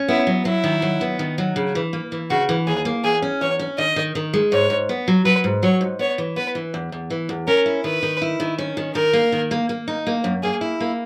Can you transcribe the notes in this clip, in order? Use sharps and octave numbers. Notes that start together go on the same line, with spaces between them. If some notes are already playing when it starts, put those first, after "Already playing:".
Already playing: C#4
B3 E4
F#3
F#3 E4
D#3
F#3
B3
D#3
F#3
C#3
E3
A#3
E3
C#3 F#4
E3
D#2 G#4
A#3
E2 G#4
C#4
E2 C#5
C#4
D#3 D#5
D#3
D#3
G#3
G#2 C#5
G#2
B3
F#3
F#3 B4
G#2
F#3 C#5
G#2
B3 C#5
E3
B3 B4
E3
E2
E2
E3
E2
C#4 A#4
E4
D#3 B4
D#3
E4
D#3
C#4
D#3
D#3 A#4
A#3
D#3
A#3
A#3
D#4
A#3
F#2
A#3 G#4
E4
A#3